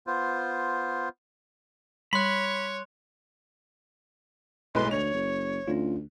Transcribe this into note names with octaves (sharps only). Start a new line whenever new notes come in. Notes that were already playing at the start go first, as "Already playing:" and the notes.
B3 F4 C5
G3 C#5 B5 C6 F#6
B1 A2 G#3 B4 C6
D2 C#5 F7
F#1
D2 C#4 F4